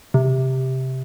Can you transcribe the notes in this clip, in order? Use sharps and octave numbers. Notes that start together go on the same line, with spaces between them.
C3